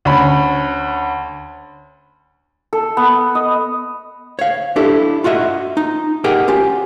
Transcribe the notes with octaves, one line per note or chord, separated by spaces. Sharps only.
D2 C#4 B5
A4
B3
D#5
C#5 F5
D4 E4 G4 A4
F4 F#4 D#5 E5
D#4
G4 G#4 A#4 D#5 F#5 G5
C#4 F4 G4